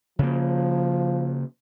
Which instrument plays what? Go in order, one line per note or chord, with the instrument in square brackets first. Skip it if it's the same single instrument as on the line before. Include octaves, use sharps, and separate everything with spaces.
[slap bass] C#3 A#3 [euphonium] F3